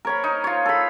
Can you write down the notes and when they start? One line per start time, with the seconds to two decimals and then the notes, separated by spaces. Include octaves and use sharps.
0.05 A#4 C#5 B5
0.24 D#4
0.44 F4 C#5
0.66 A4 B5